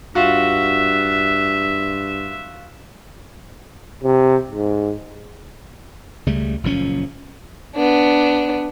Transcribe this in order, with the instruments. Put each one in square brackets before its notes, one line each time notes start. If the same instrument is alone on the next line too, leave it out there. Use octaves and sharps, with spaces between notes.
[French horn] G2 [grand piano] F4 F#4 [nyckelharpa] E5
[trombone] C3
G#2
[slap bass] C#2 C#3 G3 A3
F#1 A#2 F3 C#4
[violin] B3 D4